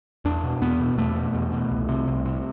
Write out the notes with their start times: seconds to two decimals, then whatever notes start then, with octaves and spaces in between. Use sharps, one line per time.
0.25 E2 D4
0.43 B2
0.61 E2 B3
0.80 B2
0.98 E2 A3
1.16 B2
1.34 E2
1.52 B2
1.71 C2
1.89 C3
2.07 C2
2.25 C3